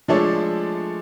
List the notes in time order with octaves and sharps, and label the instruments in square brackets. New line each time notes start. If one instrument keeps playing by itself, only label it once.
[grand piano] F3 G#3 A3 D4 A4 C#5